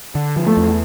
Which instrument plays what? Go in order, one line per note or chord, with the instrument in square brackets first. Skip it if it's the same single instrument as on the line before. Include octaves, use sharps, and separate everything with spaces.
[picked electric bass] D3
F3
[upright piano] A3
[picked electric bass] E2